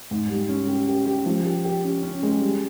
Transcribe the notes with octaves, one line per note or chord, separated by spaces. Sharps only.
G#2
G3
C#4
G4
G4
G4
F3
G4
G4
C#4
C#4
G#3
G3